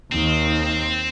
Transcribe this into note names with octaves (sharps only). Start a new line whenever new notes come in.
D#2 D#3 C4